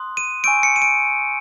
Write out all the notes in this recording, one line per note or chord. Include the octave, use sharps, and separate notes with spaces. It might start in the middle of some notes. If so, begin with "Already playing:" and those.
Already playing: C6 D#6 F#6
D#7
G#5 C#6 E6 G6 D7
C#7
D#7
D7